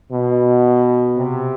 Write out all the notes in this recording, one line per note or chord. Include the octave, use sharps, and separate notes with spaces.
B2
C3